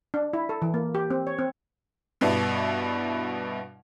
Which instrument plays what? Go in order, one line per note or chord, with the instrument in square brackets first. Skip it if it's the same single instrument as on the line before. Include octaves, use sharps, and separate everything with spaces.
[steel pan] D4
E4
A4
E3
A#3
G4
C4
C#5
C4
[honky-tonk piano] G2 B2 B3 D4 E4